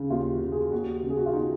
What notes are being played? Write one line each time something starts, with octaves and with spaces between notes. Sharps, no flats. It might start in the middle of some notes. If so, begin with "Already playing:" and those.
Already playing: D#2 C#3
D#2 F4
F#4
C#3
G#4
D#2 F#4
C#3
G#4
F#4
F4
D#4